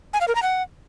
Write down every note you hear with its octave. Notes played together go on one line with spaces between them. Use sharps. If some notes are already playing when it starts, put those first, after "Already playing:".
G#5
F5
A#4
A#5
F#5